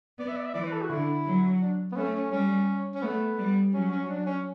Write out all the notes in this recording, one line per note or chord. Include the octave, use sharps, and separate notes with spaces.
B3 D5
E5
D5
E5
E3 D5
B4
A4
F#4
D3 E4
F#3
D4
B3
A3 C#4
C#4
G3 C#4
C#4
A3 B3
G3
F#3 C#4
C#4
D4
C#4